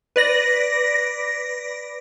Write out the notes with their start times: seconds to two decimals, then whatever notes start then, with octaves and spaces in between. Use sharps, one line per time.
0.16 B4 D5 A#6